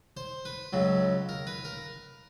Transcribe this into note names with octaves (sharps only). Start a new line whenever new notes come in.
C5
B4
C#2 C#3 F#3
A#4
B4
A#4